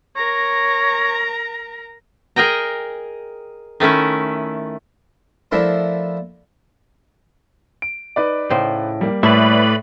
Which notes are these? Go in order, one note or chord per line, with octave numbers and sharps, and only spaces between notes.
A#4 C#5 A#5
G#4 A#4 D#5 G5 A#5
D#3 A3 C#4 E4
F3 A3 D4 E4 A#4 C5
D7
D#4 B4 D5
A2 C#3 C5
G3 A#3
A2 E4 A4 B4 D5 E5 B5